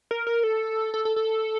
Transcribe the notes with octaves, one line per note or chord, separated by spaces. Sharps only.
A#4
A#4
A4
A4
A4
A4